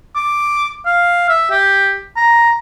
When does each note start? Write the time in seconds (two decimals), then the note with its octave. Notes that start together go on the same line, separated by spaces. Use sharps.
0.15 D6
0.86 F5
1.29 E5
1.51 G4
2.16 A#5